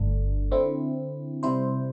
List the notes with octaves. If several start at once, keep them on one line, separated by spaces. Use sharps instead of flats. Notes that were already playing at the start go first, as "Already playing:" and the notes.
Already playing: G1 G2 D3 A3 D4
D3 C4 E4
C3 G3 E4 C5